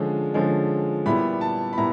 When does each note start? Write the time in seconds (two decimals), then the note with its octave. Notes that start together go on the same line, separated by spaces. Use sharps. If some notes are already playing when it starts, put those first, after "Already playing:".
Already playing: D3 F3 G#3 C#4
0.34 D3 F3 G#3 C#4
1.06 A#2 G3 B3 E4 B5
1.41 A5
1.73 B5
1.78 A#2 G3 B3 E4 A#5